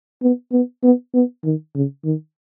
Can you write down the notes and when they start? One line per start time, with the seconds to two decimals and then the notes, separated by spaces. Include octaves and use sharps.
0.22 B3
0.52 B3
0.83 B3
1.14 B3
1.44 D#3
1.75 C#3
2.04 D#3